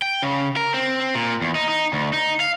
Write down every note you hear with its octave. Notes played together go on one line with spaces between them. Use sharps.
G5
C#3
A#4
C4
A#2
E2
D#4
D#4
D2
D#4
F5